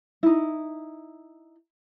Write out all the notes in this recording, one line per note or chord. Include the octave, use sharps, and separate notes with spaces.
D#4 E4